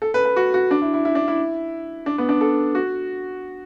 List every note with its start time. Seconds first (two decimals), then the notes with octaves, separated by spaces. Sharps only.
0.02 A4
0.14 B4
0.25 B4
0.36 F#4
0.54 F#4
0.71 D4
0.82 E4
0.94 E4
1.05 E4
1.15 D4
1.28 E4
2.06 D4
2.18 B3
2.29 D4
2.41 A4
2.75 F#4